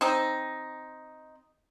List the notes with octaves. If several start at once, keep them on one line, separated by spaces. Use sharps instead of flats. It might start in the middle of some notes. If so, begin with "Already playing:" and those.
C4 D#4